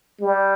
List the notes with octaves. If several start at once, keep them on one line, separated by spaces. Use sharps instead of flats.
G3